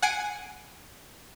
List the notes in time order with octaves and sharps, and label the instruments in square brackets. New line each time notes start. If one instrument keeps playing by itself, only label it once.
[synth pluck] F#5 G#5 C7 D7